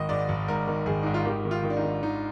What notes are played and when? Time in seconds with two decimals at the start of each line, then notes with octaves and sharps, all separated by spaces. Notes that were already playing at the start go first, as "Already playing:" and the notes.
Already playing: G#1 D#3 D#5
0.09 G#2 D5
0.29 G#1
0.48 G#2 A#4
0.67 D#3
0.86 G#1 G#4
1.03 G#2 D#4
1.14 F4
1.25 D#3 G4
1.45 D#3
1.51 F4
1.63 D#3
1.70 D4
1.77 D#4
1.83 D#3
2.02 D#3 D#4